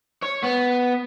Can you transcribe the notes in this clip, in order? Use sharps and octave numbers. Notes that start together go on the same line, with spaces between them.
C#5
B3